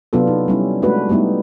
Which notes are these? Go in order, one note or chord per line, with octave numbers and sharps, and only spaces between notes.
C3 F#3 B3 D4 F4 A4
D#4
G3 C#4 E4
G#3 A3 D4 F#4 B4
G3 A3 B3 D#4 E4